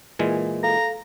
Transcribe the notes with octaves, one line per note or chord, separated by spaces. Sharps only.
A#2 E3 G#3
A4 F5 A#5